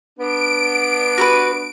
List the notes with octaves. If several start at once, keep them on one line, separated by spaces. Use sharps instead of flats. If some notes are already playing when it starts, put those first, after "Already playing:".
B3 D4 D7
F#4 A#4 B4